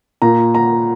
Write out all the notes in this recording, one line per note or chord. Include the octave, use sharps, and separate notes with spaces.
A#2 A#5
A#5